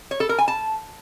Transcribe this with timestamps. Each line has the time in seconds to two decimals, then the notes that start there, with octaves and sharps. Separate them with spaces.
0.11 C#5
0.20 A4
0.29 A#4
0.38 G#5
0.48 A5